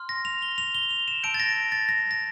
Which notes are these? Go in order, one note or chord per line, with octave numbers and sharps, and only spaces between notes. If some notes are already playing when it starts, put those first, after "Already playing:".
Already playing: C6 F6
A#6
F7
G7
F7
G7
F7
E7
A5 E6 G6 D7
A6
A#6
A6
A#6
A#6